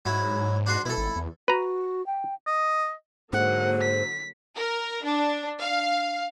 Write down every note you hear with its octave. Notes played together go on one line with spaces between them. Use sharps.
G#2 F#3 E4
D4 F#4 C6
B2 E4 A4
G#1
E2
F#4 B4 A#5
G5
D#5
G#2 D3 F#3 A#3 C5 F#5
B6
A#4
D4
F5